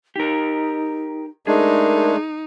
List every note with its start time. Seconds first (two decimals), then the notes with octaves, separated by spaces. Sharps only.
0.16 D#4 G4 A#4
1.47 G#3 A3 D4 D#4 G#4 A#4